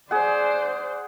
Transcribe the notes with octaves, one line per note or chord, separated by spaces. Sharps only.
G#4 C5 D5 F#5